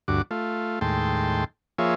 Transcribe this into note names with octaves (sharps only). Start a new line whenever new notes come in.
D2 G2 F#4 D6
A3 F4
D#2 A2 G#3 G5 A5 C6
F3 A#3 F4 G#4 C#5 E5